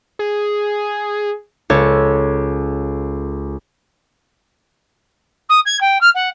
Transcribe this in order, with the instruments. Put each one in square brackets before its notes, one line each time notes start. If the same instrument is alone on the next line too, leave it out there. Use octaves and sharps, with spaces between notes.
[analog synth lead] G#4
[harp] C#2 A4 C#5
[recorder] D#6
G#6
G5
F6
F#5